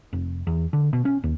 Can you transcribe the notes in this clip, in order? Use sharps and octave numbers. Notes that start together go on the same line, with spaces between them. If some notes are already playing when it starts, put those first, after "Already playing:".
F1
E2
D3
B2
C#4
D#2